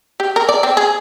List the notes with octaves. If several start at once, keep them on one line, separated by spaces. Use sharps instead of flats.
G4
A#4
D5
C4
G#4